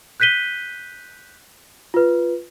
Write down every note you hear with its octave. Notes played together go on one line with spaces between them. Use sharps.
F#6 G6 B6 D#7 G7
F4 B4